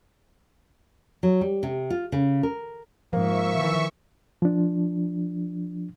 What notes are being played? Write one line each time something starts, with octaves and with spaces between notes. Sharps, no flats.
F#3
G3
C3
F4
C#3
A#4
G#2 F3 A#3 E5 C#6
D#3 E3
F3 D4